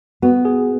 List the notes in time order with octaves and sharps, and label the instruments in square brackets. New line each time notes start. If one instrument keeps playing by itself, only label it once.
[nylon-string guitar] B3 [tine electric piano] F#4
[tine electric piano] G#4